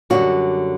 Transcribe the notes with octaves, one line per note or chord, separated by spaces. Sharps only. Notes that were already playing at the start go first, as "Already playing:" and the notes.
F#2 D3 G3 F#4